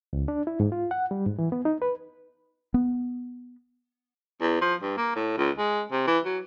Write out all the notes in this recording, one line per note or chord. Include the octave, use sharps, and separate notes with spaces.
C#2
D4
E4
G#2
F4
F#5
G3
G#2
E3
B3
D#4
B4
B3
E2
F3
G2
A#3
A2
C#2
G#3
C3
E3
F#3